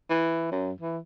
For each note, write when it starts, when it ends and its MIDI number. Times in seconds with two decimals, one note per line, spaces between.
0.10 0.47 52
0.51 0.71 42
0.80 0.98 52